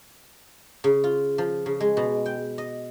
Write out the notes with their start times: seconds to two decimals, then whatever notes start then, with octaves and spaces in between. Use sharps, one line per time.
0.84 C#3
1.04 F4
1.38 F3
1.66 C#3
1.80 G#3
1.97 B2
2.26 G5
2.58 D#5